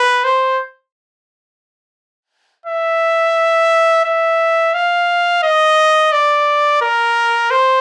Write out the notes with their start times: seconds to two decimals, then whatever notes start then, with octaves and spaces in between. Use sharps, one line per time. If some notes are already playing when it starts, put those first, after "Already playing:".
Already playing: B4
0.24 C5
2.66 E5
4.04 E5
4.74 F5
5.43 D#5
6.12 D5
6.82 A#4
7.51 C5